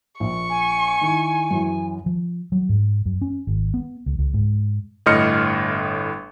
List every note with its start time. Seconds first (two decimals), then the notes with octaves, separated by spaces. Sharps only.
0.20 A#1 C#6
0.49 G#5
1.01 D#3 E4
1.51 F#2 E3
2.06 F3
2.52 F#3
2.69 G#2
3.06 F#2
3.21 C#4
3.47 G#1
3.74 B3
4.06 C#2
4.19 C#2
4.34 G#2
5.06 G1 A2 D#5 C6 F6 C#7